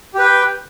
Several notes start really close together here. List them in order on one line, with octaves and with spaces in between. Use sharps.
G4 B4 G5